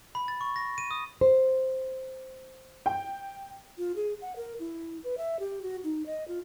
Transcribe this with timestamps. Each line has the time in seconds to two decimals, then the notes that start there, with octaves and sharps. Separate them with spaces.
0.15 B5
0.28 A6
0.41 C#6
0.56 A#6
0.78 D#7
0.91 D#6
1.21 C5
2.86 G5
3.78 F4
3.96 G#4
4.22 F#5
4.36 A#4
4.59 E4
5.04 B4
5.18 E5
5.40 G4
5.63 F#4
5.84 D#4
6.06 D#5
6.28 F4